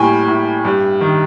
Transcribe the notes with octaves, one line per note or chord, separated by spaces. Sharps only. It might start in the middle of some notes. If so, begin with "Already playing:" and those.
Already playing: A2 G3 A#3 G5 G#5
A2
G2
D#3